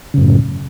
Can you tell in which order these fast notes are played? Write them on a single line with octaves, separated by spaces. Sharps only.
C#3 F#2 A2